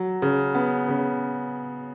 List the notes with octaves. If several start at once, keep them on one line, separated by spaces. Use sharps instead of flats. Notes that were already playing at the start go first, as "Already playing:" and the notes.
Already playing: F#3
C#3
B3
C#3